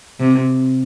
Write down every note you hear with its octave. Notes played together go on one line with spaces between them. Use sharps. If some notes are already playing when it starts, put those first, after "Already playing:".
C3